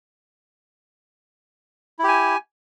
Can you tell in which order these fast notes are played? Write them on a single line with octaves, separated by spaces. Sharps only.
E4 G4 G#5